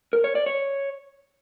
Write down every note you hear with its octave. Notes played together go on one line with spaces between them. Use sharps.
A#4
C#5
D5
C#5